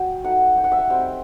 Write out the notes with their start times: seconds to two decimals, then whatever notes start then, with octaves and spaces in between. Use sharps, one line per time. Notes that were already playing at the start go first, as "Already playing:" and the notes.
Already playing: F#3 G5
0.24 F#3 A3 D#4 F#5
0.57 G5
0.64 F#5
0.72 E5
0.79 F#5
0.90 G3 C4 D#4 G5